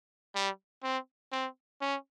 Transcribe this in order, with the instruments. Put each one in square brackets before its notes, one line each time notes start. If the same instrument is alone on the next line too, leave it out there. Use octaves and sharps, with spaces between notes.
[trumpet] G3
C4
C4
C#4